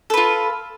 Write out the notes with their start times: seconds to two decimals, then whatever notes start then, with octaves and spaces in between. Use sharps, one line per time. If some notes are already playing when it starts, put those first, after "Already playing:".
0.10 A4
0.14 B4
0.17 F4